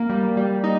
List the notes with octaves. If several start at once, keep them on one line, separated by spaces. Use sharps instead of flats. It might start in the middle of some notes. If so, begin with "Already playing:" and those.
Already playing: A#3
G3
G3
D#4